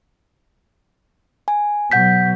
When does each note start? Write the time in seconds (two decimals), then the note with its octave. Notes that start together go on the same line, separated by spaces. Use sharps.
1.48 G#5
1.92 B2 F#3 F#5 G6 B6